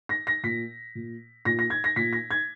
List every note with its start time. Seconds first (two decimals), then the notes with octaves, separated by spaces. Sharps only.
0.09 A#6
0.27 A#6
0.43 A#2 B6
0.95 A#2
1.45 A#2 A#6
1.59 A#6
1.70 G#6
1.84 A#6
1.96 A#2 B6
2.13 A#6
2.31 G#6